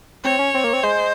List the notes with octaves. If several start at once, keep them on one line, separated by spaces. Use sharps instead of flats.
C4 C#5
C#4
C4
A#3
C4
G#3 C5